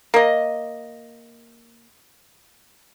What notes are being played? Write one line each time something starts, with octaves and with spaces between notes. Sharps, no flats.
A#3 D#5